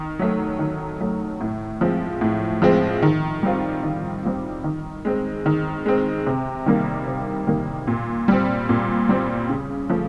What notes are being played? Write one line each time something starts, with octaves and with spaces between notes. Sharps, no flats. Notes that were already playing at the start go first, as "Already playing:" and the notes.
Already playing: D#3
F#3 A3
D#3
F#3 A3
A2
F3 G#3 C4
A2
F3 G#3 C4
D#3
G3 C4 F4
D#3
G3 C4 F4
D#3
G#3 C4
D#3
G#3 C4
C3
D#3 G3 A#3
C3
D#3 G3 A#3
A#2
G3 C4
A#2
G3 C4
C#3
F3 A3